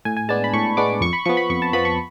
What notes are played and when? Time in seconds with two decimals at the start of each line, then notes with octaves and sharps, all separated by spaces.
0.05 A2 G#5
0.17 G#5
0.29 G#3 B3 D4 A5
0.44 B5
0.53 A2 C#6
0.77 G#3 B3 D4 D6
1.01 F2 C#6
1.13 B5
1.25 F3 B3 C#6
1.37 B5
1.50 F2 C#6
1.62 A5
1.73 F3 B3 B5
1.85 C#6